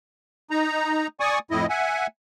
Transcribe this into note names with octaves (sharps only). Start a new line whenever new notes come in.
D#4 A#5
D5 G#5 C#6 D#6
F2 A2 E4 D#5
E5 F#5 G#5